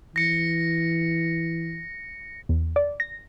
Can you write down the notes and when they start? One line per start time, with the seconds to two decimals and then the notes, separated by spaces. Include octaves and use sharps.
0.16 E3 A#6 C#7
2.49 E2
2.76 D5
3.00 A#6